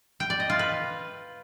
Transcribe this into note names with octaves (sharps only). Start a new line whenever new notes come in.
G5
D5
D#5
F4
B4